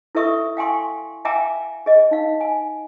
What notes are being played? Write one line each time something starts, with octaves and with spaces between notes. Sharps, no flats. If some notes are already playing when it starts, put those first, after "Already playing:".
E4 A4 B4 E5 C#6 D#6
F5 G5 G#5 C6 C#6
E5 F5 G5 G#5 A#5 D6
G#4 D#5
D#4 F5
G#5